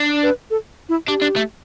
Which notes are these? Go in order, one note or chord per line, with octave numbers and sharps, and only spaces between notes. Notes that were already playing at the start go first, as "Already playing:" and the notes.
Already playing: D4
B4
A4
E4
D4 G4
D4
A3